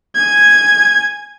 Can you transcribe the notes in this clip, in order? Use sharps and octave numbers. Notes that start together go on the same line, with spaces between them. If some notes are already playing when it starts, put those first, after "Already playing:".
G#5 G#6